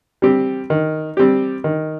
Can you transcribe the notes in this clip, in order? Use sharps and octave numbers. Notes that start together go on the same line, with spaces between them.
G3 C4 G4
D#3
G3 C4 G4
D#3